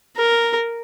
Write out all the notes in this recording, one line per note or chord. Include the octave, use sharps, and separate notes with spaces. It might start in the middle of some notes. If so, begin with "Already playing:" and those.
A#4